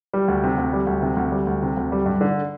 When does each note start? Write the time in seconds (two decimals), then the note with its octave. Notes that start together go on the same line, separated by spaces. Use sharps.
0.14 G3
0.28 D2
0.43 C3
0.58 D2
0.73 G3
0.87 D2
1.02 C3
1.17 D2
1.32 G3
1.47 D2
1.62 C3
1.77 D2
1.92 G3
2.06 G2
2.21 D3